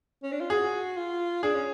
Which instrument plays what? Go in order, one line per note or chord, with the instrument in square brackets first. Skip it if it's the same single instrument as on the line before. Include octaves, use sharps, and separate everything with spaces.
[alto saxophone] C#4
D4
F4
[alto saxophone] F#4 [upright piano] G#4
[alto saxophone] F4
[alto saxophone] D4 [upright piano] G#4
[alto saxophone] C#4